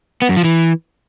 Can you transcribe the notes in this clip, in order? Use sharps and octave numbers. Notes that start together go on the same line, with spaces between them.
B3
F#2
F3
E3